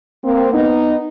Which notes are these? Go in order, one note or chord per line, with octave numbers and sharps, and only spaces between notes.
A#3 C4
B3 D#4